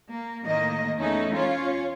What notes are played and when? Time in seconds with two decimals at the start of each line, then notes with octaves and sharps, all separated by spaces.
0.12 A#3
0.46 A2 D#3 A#3 D#5
0.97 E2 A3 C#4 D#4
1.34 C#4 F4 C#5